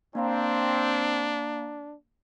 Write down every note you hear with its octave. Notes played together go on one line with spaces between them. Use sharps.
A#3 C4 D4 F5 A#5